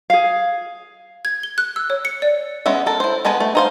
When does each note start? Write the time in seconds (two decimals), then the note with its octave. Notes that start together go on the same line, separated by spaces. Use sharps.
0.10 G#4 F5
1.25 G#6
1.43 G7
1.58 F#6
1.76 E6
1.90 C#5
2.05 C#7
2.22 D5
2.66 G#3 B3 C#4 E5
2.86 A4 A#4
3.00 E4 C5
3.25 G#3 B3 A4 B4 G#5
3.40 A3
3.55 D#4 C5 F5